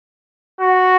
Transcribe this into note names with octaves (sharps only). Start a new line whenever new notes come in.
F#4